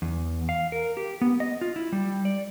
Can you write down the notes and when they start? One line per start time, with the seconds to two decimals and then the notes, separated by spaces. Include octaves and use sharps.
0.02 E2
0.49 F5
0.72 A#4
0.97 G4
1.21 B3
1.40 D#5
1.61 F4
1.76 E4
1.92 G3
2.25 D5